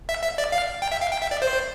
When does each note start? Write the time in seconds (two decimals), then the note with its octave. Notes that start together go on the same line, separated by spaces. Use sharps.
0.09 E5
0.23 E5
0.38 D5
0.52 F5
0.82 G5
0.92 E5
1.01 F5
1.12 G5
1.22 E5
1.31 D5
1.42 C5